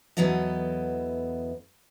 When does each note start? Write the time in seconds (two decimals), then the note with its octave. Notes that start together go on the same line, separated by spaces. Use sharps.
0.17 E2 F#3 B3 E4 A4 D#5